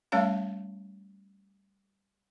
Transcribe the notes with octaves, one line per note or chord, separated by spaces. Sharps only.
G3 A3 C#4 C#5 F5 A5